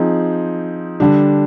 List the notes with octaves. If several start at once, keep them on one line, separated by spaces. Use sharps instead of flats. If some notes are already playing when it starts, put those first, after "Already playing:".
Already playing: F3 C4 D#4 G#4
D3 G3 D4